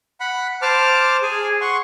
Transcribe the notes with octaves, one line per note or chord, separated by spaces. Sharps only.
F#5 B5
C5 A5 D6 F6
G#4 G#5
F#5 C6 C#6